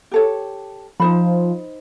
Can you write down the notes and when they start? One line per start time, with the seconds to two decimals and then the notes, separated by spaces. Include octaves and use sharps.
0.11 G4 A4 C#5
1.00 F3 D#4 C5 B5